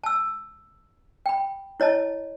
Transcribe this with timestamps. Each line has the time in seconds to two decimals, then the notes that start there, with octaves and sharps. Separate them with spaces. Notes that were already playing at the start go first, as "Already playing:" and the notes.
0.04 A5 E6
1.26 G5 B5
1.80 E4 C#5 D#5 A5